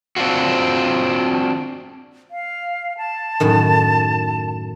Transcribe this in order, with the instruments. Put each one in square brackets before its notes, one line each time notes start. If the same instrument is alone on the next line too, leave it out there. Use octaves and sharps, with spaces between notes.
[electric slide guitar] C4 D4 F4 F#4
[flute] F5
A5
[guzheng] F#2 A2 D#3